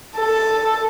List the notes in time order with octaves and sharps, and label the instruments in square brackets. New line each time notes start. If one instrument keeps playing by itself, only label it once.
[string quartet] A4